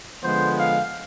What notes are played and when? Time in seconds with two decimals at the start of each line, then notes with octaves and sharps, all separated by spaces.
0.22 D3 F3 G#3 B3 C5
0.57 F5